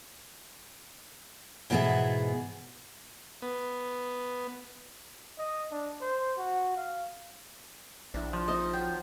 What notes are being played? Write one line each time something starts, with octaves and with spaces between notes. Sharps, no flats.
G#2 B2 E3 B3 E4 G#4
B3
D#5
D4
C5
F#4
F5
A#1 D4 E4
F3
C4 D#4 D#5 E5
F#3 C5 G5